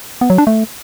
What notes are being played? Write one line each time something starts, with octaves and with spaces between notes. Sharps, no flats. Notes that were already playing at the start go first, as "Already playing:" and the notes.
B3
F#3
D4
A3